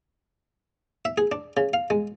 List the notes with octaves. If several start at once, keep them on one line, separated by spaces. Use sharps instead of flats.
E5
G#4
D4
C#3
F5
G#3